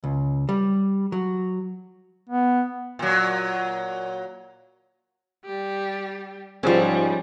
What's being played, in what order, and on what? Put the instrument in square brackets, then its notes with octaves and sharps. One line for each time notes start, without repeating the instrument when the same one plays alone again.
[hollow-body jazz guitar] C#2
G3
F#3
[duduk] B3
[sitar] A#2 F#3
[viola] G3 G4
[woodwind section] G#2 [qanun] F3 C#4 [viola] G3